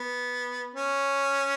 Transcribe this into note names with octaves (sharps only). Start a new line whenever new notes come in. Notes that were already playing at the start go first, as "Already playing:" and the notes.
Already playing: B3
C#4